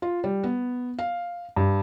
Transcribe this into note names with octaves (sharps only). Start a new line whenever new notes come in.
F4
G3
B3
F5
G2